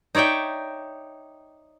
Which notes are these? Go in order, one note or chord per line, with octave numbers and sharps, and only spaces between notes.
D#4 C#5 D5 E5 G5